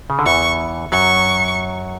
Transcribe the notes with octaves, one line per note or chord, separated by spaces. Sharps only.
C#3
D3
E2 E3 C#6
F#2 F#3 C#6